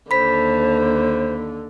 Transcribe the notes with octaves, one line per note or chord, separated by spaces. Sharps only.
D#2 D3 C5 B5 B6